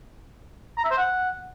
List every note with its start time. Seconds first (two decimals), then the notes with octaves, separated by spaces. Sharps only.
0.78 A#5
0.84 E5
0.91 C5
0.98 F#5